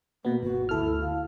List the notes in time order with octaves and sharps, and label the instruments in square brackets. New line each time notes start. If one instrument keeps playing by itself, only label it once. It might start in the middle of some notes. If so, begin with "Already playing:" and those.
[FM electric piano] B2 B3 [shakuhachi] A#3
[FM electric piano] G1 [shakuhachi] F#4
[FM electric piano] D2 A4 F6 [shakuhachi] E4
[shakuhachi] F5